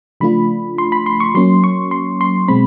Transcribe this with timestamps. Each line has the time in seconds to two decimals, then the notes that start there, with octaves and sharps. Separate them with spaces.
0.20 C#3 F3 A3 D4 F4 B5
0.78 C6
0.92 B5
1.06 C6
1.20 C#6
1.34 F#3 A#3 C#4 C6
1.64 C#6
1.91 C6
2.21 C6
2.48 B2 G#3 C4 B5